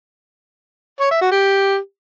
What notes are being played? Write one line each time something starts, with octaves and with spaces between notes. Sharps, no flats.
C#5
E5
F#4
G4